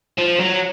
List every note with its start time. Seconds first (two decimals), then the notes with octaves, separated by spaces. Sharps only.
0.19 F3
0.40 F#3